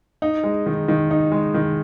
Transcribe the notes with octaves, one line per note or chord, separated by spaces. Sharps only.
D#4
G#3
D#3
D#3
D#4
G#3
D#3